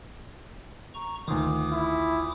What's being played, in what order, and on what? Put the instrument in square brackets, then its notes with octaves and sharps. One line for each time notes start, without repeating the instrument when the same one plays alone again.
[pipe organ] A#5 C#6
[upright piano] D2 D#3 [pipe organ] F4 D6 D#6
[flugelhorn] E4